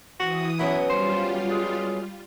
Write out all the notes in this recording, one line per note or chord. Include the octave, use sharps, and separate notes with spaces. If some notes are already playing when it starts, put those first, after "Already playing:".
E3 C4 F#4 D#6
F#3 B3 C#4 E4
G3 F4 C5
G#3